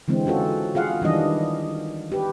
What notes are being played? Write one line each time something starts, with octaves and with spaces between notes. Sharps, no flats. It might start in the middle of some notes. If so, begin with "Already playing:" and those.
D3 E3 G#3 C4
C#4 F4 F#4 A4
F4 G#4 F5 F#5
D#3 E3 G3 D4 D#5
G4 B4